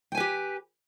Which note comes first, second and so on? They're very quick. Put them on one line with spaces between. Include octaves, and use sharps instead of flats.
G5 G#5 B4 G4